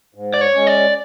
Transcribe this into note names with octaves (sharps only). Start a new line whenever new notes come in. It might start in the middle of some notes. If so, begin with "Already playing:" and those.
G#2
D5
C#5
G#3 C#4
D5